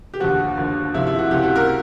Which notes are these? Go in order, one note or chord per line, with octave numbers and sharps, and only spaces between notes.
G4
D#2 D3 F3 F#4
D#2 D3 F3
C#2 C3 F3 E4
E4
F#4
C#2 C3 F3 G4
F#4
A#4